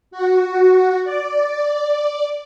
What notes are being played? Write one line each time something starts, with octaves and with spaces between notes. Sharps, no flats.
F#4
D5